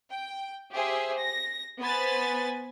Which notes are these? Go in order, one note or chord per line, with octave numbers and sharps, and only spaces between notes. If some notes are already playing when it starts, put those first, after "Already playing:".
G5
G4 G#4 C5 E5
A#6
B3 B4 C5 G#5 B5 A6